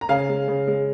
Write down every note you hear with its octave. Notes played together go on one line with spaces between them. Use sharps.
A#5
C#3 F5 G#5
G#3
C#3
G#3